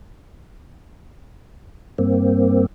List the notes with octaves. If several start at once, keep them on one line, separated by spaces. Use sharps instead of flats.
G2 A#3 C4